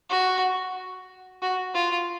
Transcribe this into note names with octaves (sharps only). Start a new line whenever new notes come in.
F#4
F#4
F4